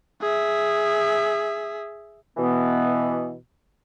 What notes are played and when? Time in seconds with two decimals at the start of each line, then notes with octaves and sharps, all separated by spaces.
0.21 G#4 E5
2.37 B2 E3 B3